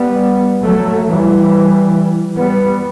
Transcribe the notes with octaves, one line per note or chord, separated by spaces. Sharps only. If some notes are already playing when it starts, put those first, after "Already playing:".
Already playing: G3 B3
F#3 A3
E3 G3
G3 B3